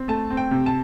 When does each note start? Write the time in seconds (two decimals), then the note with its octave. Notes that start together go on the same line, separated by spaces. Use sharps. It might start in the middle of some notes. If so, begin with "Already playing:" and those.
Already playing: C4
0.08 A3 A5
0.30 C4
0.37 G5
0.51 C3
0.66 A5